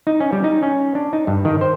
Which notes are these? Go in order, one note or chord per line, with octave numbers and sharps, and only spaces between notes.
D#4
C#4
G3
D#4
C#4
D4
D#4
G2
D#3
C5